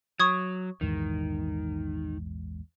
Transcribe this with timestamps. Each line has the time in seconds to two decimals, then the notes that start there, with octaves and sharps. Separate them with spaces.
0.19 F#3 C#6 D#6 G#6
0.81 A#1 E2 G#2 D#3